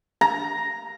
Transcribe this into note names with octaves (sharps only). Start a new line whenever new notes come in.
A#5